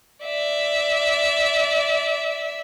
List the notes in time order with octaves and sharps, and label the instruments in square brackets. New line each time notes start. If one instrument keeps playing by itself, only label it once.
[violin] D5 E5